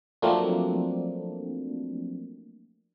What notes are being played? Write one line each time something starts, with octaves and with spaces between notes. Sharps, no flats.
F3 F#3 A3 A#3 C4 D4